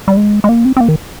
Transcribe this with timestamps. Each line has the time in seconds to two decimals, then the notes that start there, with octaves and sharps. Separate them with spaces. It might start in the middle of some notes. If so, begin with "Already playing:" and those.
0.08 G3
0.17 G#3
0.44 G#3
0.49 A#3
0.65 C4
0.77 C4
0.81 A#3
0.88 D#3